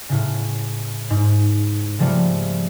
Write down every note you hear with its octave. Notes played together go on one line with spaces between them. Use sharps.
A2 C#3
G#2
C#3 F3 G3 A3 A#3